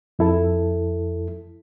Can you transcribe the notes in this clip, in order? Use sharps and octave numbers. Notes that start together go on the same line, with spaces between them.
F2 E4 A4